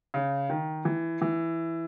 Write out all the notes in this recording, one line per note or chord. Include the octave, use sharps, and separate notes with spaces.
C#3
D#3
E3
E3